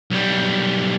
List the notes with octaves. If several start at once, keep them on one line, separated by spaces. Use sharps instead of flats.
B1 G3